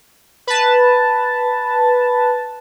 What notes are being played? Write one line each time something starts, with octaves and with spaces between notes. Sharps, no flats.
B4 A5